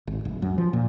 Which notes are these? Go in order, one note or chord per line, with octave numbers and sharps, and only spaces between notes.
G#1
D1
F#2
F3
A#2